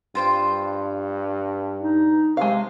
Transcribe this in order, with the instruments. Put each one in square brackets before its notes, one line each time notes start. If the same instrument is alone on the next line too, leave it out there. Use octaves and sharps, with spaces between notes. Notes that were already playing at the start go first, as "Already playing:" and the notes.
[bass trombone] G2 [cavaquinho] F4 C5 G5
[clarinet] D#4
[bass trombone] C3 [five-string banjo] G#3 F5